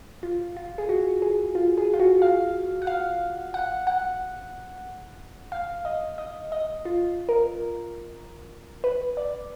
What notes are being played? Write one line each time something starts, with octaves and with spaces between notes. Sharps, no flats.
F4
F4
G#4
F#4
G#4
F4
G#4
F4
F#4
F5
F#5
F5
F#5
F#5
F5
D#5
D#5
D#5
F4
A#4
B4
D5